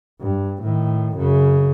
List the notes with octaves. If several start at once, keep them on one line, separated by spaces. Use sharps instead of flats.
G2
A2 D#3
F#2 C#3